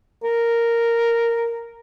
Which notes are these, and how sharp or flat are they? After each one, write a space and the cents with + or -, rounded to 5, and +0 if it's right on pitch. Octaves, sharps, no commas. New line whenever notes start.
A#4 -5